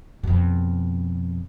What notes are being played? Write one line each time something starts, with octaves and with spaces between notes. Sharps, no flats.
F2 B2